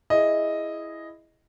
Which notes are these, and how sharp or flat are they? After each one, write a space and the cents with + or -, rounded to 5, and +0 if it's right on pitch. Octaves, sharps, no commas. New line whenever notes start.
E4 +0 G#4 +0 D#5 +0